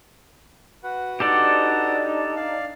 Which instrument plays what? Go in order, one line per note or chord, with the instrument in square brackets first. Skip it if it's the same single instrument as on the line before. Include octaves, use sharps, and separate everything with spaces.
[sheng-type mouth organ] F#4 B4 F#5
[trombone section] D4 D#4 [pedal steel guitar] G4 A4 D5
[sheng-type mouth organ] D5 F5